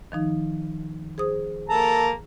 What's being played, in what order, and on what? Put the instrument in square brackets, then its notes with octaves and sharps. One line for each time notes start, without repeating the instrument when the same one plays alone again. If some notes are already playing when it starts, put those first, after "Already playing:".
[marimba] D#3 F3 D#4
G#4 C5 D#6
[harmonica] A#3 A4 A#5